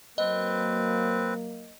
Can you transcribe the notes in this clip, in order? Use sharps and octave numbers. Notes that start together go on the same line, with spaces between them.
F#3 A#3 C4 B4 D#5